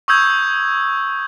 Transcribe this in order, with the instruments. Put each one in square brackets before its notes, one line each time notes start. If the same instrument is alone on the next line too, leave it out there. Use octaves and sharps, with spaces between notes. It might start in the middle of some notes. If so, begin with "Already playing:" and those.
[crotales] C#6 D#6 E6 G6 G#6